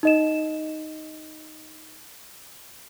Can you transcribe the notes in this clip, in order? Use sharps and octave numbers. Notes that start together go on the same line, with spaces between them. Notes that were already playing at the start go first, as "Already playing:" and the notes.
D#4 D#5 E7